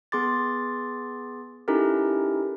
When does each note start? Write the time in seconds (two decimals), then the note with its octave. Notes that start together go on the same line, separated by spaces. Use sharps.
0.12 B3 G#4 C6 D6 A6
1.68 C#4 D#4 E4 G4 A4 A#4